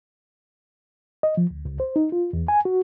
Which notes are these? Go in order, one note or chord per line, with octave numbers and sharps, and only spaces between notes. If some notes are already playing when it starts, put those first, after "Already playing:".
D#5
F3
D2
C#2
C5
D#4
F4
E2
G#5
F#4